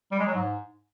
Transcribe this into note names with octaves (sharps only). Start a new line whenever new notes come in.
G3
G#3
F#3
G#2